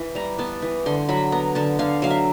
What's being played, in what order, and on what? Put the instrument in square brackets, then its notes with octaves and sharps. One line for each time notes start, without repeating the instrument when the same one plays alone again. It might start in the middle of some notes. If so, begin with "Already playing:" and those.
Already playing: [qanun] E3
G3 A#5
B3 A5
E3
D3 C6
F#3 B5
B3 A#5
D3 A5
D3 F5
F#3 F5
E5